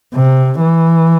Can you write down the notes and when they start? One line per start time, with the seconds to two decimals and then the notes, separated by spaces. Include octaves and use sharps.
0.14 C3
0.60 E3